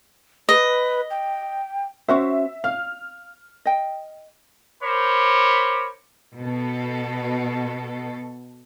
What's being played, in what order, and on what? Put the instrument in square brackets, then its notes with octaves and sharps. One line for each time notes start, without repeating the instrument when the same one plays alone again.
[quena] B4 [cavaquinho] D#5
[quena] G5
[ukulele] C#4 F#4 C5 [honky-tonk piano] E5
[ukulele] F5 [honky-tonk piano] F6
[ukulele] D#5 G5
[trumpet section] A#4 C5 C#5 B5 D6
[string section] B2 A4